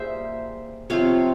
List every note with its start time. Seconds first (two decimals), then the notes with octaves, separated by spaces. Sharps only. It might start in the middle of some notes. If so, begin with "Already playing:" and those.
Already playing: G3 A#3 G#4 C5 E5
0.90 C3 F3 C4 F4 C#5 F5